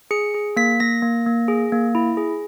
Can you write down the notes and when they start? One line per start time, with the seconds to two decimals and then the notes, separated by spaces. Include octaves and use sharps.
0.11 G#4 C#7
0.34 G#4
0.56 A#3 B6
0.80 A#3 A#6
1.02 A#3
1.26 A#3
1.48 G#4
1.72 A#3
1.95 E4
2.17 G#4